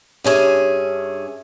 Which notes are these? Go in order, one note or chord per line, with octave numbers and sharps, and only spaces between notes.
G2 C#4 G#4 E5